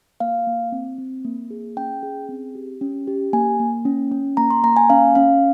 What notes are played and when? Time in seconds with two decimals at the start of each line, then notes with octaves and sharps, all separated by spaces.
0.20 A#3 F5
0.47 A#3
0.72 C4
0.98 C4
1.25 A#3
1.51 G#4
1.77 C#4 G5
2.03 G#4
2.29 C4
2.55 G4
2.81 C#4
3.08 G4
3.33 A#3 G#5
3.59 A#3
3.85 C#4
4.12 C#4
4.37 A#3 A#5
4.50 C6
4.64 A#3 A#5
4.77 G#5
4.90 C#4 F5
5.15 C#4 F5